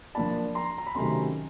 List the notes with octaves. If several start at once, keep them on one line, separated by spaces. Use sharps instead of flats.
F3 A#3 D4 A5 B5
A#5 C6
A#5
B5
C3 D#3 F#3 A3 C#4 A#5 C6